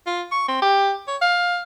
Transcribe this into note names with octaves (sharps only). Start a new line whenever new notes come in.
F4
C#6
C4
G4
C#5
F5